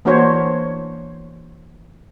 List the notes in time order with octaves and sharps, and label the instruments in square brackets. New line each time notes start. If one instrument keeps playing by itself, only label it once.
[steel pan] E3 A#3 D4 F#4 C5 C#5